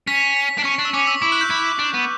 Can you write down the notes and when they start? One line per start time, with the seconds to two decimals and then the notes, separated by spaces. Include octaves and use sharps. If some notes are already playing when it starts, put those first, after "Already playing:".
0.07 C#4 B6
0.37 B6
0.59 D4
0.65 C#4 C#6
0.79 D4
0.85 E6
0.94 C#4 D6
1.07 E6
1.22 E4 D6
1.32 F#6
1.41 G6
1.50 E4
1.79 D4
1.94 B3